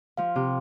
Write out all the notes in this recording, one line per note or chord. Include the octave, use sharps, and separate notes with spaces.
F3 F5
C3